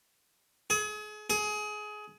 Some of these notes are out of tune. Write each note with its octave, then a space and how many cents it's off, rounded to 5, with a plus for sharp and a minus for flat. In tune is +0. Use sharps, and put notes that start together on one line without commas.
G#4 +35
G#4 +25